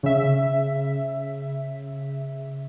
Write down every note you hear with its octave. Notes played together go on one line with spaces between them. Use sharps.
C#3 E5